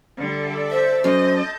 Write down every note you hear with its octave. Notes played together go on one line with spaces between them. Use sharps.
D3 G3 A4 D5 E5
C5 E5 E6 A6
F#2 D#5 A5 G6